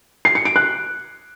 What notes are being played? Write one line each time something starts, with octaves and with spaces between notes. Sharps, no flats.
C7
C#7
D7
F#6